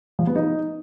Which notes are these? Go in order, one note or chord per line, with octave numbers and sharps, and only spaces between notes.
F3
B3
D#4